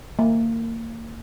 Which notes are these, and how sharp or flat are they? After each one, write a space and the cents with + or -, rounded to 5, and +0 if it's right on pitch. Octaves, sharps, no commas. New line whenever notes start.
A#3 -30